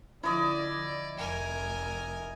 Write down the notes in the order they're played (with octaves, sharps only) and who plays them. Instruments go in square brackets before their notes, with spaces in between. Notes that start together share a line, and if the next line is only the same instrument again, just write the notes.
[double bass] D3 F3 [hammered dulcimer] E4 D#5 [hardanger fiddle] D5
[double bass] F1 F2 [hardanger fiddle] A#4 G#5